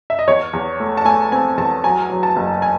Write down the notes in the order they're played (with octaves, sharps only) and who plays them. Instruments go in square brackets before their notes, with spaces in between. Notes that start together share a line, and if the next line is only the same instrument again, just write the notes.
[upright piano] E5
D#5
E2 C#5
E2
A3
A5
A3 G#5
C4 G#5
E2 A5
F#3 G#5
F#3
A5
F#1
G#5